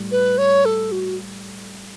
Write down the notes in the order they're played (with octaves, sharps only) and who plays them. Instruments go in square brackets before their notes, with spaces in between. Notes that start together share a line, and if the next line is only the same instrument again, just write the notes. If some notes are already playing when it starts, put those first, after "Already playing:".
Already playing: [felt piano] A2 G3
[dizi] B4
C#5
A4
F#4